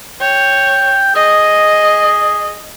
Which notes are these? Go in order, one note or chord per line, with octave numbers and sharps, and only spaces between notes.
C#5 G5
G#4 D#5